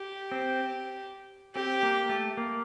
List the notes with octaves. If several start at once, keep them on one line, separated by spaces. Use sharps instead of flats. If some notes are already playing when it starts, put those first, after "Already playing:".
Already playing: G4
C4
C4 G4
A#3
A3
A#3